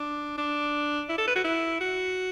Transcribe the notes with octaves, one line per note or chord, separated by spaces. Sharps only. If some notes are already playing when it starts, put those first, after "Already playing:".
Already playing: D4
D4
E4
A4
B4
F#4
E4
F#4